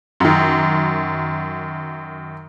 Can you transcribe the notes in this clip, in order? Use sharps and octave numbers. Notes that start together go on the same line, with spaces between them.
F#2 D#3